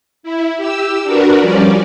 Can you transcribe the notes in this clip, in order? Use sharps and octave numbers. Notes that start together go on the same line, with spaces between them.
E4
G4 E6
D4 F#4 A#4 B4
F3 G3 C#4 D5